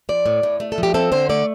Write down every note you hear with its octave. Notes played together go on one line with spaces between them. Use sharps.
F3 D5
A2
A2
A3
A4
F3
G4
C4 A4
D3 C5
A3 D5